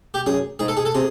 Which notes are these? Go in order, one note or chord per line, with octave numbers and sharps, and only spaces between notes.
G4
F#2 G#4
G#2 G#4
A4
G#4
A4
C3 G#4